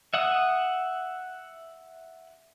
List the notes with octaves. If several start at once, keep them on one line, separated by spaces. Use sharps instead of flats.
E5 F#5 D#6